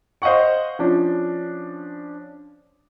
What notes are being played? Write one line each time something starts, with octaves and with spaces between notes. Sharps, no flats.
C5 D#5 F5 F#5 C#6
F3 C#4 D4